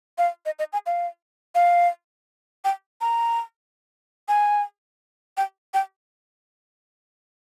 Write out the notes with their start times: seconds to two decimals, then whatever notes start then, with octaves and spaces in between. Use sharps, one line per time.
0.18 F5
0.46 D#5
0.59 D#5
0.73 G#5
0.86 F5
1.55 F5
2.65 G5
3.01 A#5
4.28 G#5
5.37 G5
5.74 G5